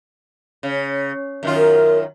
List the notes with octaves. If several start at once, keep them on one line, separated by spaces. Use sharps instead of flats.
C#3
F#2 D#3 F4
A#4